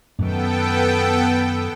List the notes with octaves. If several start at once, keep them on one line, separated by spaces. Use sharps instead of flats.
F#2 D#3 B3 A4 G5